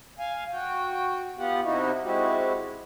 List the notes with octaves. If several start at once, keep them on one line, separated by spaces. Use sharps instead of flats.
F5 G#5
F#4 G5
B3 F4 G4 F#5
C3 D#4 E4 F#4
G#3 C4 E4 F#4 G4